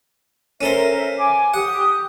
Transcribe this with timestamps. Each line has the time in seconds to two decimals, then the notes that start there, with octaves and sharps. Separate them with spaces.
0.61 C#4 A4 A#4 C5 E5
1.17 G#5 D6
1.54 G4 F#5 D#6